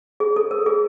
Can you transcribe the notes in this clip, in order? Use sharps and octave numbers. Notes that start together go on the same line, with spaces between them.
G#4
A4
A#4
G#4